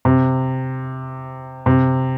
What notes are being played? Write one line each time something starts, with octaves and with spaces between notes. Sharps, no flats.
C3
C3